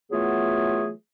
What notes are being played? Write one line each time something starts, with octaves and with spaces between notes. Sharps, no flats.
E3 F#3 A3 B3 F4 G#4